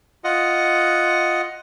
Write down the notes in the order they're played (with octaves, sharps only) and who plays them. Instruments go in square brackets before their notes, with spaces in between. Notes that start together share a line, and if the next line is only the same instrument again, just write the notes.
[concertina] F4 D#5 F#5